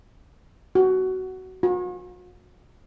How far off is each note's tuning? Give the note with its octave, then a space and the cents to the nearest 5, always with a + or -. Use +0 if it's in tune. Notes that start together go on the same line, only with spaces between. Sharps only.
F#4 +15
F#4 -45